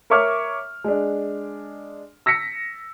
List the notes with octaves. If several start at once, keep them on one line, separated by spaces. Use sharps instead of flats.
A#4 C#5 E5 C#6 D6 F6
G#3 D4
E6 A#6 B6 C#7